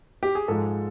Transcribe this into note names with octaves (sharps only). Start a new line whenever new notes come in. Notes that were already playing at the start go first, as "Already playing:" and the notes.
G4
G#4
G#2 F3 G#3 A4